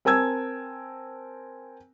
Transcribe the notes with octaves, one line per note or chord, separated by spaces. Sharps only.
C4 A#4 G#5 A5 E6 G#6